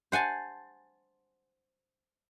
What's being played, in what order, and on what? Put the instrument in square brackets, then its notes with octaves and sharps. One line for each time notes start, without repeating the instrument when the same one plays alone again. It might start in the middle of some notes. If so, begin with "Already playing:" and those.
[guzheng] C5 F#5 G#5 A5